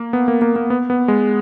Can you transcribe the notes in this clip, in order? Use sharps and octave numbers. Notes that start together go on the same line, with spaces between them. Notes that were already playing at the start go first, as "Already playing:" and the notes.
Already playing: A#3
B3
A#3
A#3
A#3
B3
B3
G#3